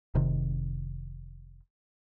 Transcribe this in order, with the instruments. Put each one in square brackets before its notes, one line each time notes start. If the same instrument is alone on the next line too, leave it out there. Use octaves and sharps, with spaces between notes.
[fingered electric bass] F1 C3 D#3